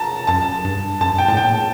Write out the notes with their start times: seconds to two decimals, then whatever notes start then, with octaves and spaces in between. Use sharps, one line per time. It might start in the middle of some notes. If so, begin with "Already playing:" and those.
Already playing: A5 A#5
0.27 F#2 A5
0.65 G2
1.01 F#2 A5
1.09 G2
1.18 A#2 G5
1.28 A2 A5
1.37 A#2 G5